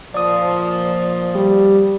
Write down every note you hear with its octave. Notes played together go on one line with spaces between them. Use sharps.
A#2 F3 D5 D#6
G3